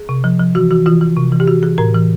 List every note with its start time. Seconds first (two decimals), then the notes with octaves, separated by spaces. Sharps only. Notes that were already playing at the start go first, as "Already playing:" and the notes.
Already playing: G#4
0.09 C3
0.24 F3
0.40 F3
0.55 E3 F#4
0.71 E3 F#4
0.86 E3 F4
1.01 E3
1.16 C3
1.32 E3
1.40 G4
1.48 E3 F#4
1.63 E3 G#4
1.78 A2 A#4
1.94 E3